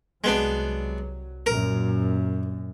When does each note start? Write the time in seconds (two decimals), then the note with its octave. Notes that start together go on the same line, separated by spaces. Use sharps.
0.24 C2 F#3 G#3 B3 D4
1.46 F#2 A#2 A#4